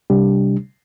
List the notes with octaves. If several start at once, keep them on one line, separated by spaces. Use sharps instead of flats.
C3 G3 D4 G4